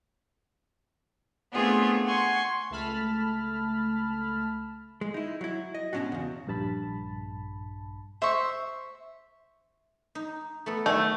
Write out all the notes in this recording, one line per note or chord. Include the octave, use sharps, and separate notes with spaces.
A3 B3 C4 D4 F4 G#4
F#5 G#5 C6 C#6
C#2 A3 A5 B5 F6
G#3
D#4 E4
F#3 E4
D#5
G#2 B2 G#3 C#4 D4 F#4
E2 C#3
A#1 G2 A5 B5
C5 E5 C#6
D#4
A3 B3 A4
D#3 F#3 A3